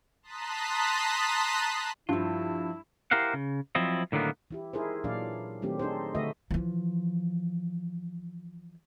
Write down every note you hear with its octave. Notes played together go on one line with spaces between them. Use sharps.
A5 A#5 C6 D#6 F#6 B6
G2 F3 E4 F4
E4 G4 A#4 C5 F5 F#5
C#3
F3 F#3 C4 E4 F4 D#5
A2 D3 D#3 F#3 A#3 B3
E3 E4 G4
D#4 E4 G#4 A#4 C5
A#2 E3 F#3 D4 D5 F5
D#3 F#3 A3 C4 D4 G4
D4 D#4 G#4 A4 C5
D3 A3 F#4 B4 D#5 E5
E3 F3